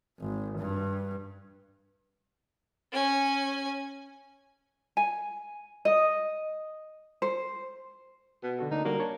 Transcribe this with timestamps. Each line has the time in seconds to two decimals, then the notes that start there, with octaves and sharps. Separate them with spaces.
0.19 G#1
0.58 G2
2.92 C#4 G#5
4.97 G#5
5.85 D#5
7.22 C5
8.43 B2
8.59 D3 F#4 A4
8.71 D2 A#3 D4 D#4
8.85 D3 G3 A#3 F#4
8.99 D4 C#5 A5